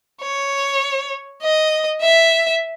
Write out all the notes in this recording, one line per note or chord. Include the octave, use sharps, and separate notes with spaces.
C#5
D#5
E5